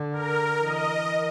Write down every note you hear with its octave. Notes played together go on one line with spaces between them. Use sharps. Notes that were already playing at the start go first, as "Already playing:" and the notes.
Already playing: D3
A#4
E3 D#5